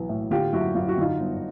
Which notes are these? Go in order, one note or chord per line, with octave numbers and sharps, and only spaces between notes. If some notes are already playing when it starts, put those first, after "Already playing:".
Already playing: B1 E3
A2
D3 F4 G4
F#2 E4 F#4
F#2 F4
F#4
D3 D#4 F4
G1